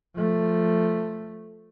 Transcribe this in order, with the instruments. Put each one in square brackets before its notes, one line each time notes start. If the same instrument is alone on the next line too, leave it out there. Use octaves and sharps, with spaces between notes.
[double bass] F3 A3